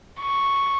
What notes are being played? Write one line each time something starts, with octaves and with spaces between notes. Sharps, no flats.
C#6